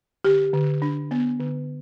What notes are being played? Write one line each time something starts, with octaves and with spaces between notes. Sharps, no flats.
D3 G4
D3
D4
B3
D3